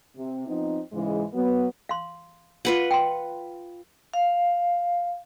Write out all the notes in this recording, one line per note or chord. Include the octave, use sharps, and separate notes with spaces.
C3
F3 B3 C4 D#4
G#2 C#3 E3 G#3
F#3 B3
F5 C6
F4 B4 F#5
G5 C6
F5